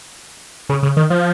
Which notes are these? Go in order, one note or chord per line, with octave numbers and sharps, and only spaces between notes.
C#3
C#3
D#3
F3